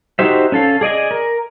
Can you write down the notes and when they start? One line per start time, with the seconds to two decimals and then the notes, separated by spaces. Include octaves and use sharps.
0.19 D#4 F#4 G4 C5 E5
0.52 C#4 A4 F5
0.81 G#4 D5 D#5 G#5
1.11 A#4